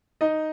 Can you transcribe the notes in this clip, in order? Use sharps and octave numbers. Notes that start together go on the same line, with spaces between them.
D#4 D#5